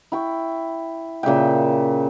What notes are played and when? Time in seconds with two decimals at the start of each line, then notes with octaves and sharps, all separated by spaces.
0.12 E4 G5 C#6
1.23 A#2 C#3 E5 G5